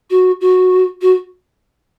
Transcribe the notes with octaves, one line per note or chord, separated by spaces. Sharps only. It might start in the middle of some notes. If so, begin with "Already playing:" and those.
F#4
F#4
F#4